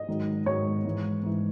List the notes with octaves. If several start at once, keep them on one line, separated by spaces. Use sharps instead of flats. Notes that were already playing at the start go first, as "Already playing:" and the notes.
Already playing: D#5
G#2 D#3 F#3
G#2 D#3 F#3 C#5
G#2 E3
G#2 E3